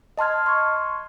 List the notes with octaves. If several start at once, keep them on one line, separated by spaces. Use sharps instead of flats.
D#5 A5 C6 F6 G#6
C6 C#6 G#6